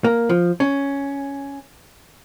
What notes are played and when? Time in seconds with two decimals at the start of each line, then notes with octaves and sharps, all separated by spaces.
0.04 A#3
0.29 F3
0.60 C#4